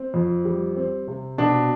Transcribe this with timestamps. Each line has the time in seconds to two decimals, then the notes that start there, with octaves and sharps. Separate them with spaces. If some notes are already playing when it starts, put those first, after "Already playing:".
Already playing: C4
0.14 F2
0.45 G3
0.76 C4
1.08 C3
1.38 B2 D4